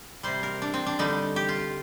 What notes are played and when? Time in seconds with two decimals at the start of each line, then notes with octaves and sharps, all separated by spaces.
0.23 C3 G3 C5
0.43 A#4
0.62 D4
0.74 C4
0.86 D4
0.99 D3 G3 D#4
1.36 G4
1.49 F4